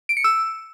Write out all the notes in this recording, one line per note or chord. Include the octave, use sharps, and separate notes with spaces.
D7
C#7
E6